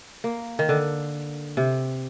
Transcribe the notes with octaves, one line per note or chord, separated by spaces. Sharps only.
A#3
D#3
D3
C3